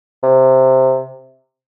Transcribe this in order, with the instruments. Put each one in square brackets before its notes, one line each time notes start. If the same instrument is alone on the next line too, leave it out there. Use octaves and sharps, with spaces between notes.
[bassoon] C3